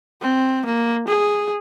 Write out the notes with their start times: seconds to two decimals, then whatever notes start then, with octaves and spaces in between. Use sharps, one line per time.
0.21 C4
0.65 A#3
1.08 G#4